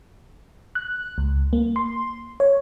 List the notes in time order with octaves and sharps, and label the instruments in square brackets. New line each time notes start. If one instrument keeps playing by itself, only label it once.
[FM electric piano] F#6
C#2
A#3
C6
C#5